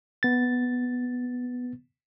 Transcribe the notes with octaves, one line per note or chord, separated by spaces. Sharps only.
B3 A6